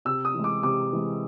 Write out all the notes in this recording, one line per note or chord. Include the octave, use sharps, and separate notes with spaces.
C3 E6
D#6
E3 G#3
D6
C3 D6
E3 G#3